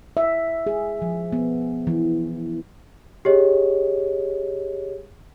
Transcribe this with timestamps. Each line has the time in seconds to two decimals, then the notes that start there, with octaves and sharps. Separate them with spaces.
0.17 E5
0.67 G#4
1.02 F3
1.32 B3
1.87 E3
3.25 G4 G#4 C#5 D#5